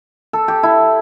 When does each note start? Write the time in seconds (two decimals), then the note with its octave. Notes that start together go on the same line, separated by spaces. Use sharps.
0.33 A4
0.48 G4
0.63 E4